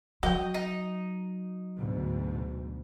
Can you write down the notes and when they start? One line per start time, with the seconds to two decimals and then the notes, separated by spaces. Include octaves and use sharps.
0.23 F#3 F#4 D#5 G5
0.54 D#4
1.77 D2 G#2 B2